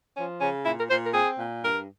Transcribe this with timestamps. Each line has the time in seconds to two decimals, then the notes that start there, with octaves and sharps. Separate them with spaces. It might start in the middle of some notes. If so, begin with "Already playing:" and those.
0.16 F3 C#4
0.41 C#3 C#4
0.65 A#2 E4
0.77 A#4
0.89 A#2 C5
1.02 A#4
1.14 C4 G#4
1.38 A#2
1.62 G2 A#4